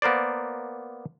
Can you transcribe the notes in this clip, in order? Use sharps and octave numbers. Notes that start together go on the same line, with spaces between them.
A#3 B3 A#4 C5 D5